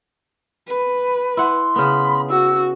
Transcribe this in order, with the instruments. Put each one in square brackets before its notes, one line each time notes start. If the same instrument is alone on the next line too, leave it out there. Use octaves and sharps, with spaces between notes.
[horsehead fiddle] B4
[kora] E4 F#5 [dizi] C6
[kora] C#3 B3 [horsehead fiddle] B5
[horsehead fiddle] F#4 [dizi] E6